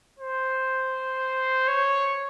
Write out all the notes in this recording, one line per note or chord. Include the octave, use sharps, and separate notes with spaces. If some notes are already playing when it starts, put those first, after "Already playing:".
C5
C#5